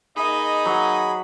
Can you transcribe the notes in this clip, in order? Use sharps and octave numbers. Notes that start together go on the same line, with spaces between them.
A#3 D#4 G#4 D#5 B5
F#3